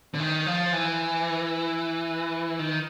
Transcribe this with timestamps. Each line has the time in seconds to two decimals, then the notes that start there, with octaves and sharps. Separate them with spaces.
0.14 D3
0.20 D#3
0.46 F3
0.73 E3
2.59 D#3